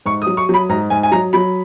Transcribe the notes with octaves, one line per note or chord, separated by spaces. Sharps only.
G#2 C#6
D#6
F#3
C#6
F#3 B5
G#2 A#5
G#2 G#5
G#5
F#3 A#5
F#3 B5